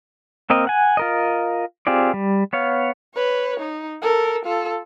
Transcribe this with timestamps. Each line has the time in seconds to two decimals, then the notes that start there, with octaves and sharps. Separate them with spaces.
0.50 A#3 C4 A#4 D#5
0.67 F#5 G#5
0.97 F4 A#4 D#5
1.87 C4 F4 G4 G#4 D5
2.14 G3
2.53 B3 C#5 F5
3.15 B4 C#5
3.60 D#4
4.02 A4 A#4
4.46 F4 A4